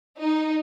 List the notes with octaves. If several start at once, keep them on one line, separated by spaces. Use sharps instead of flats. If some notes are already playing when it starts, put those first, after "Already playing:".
D#4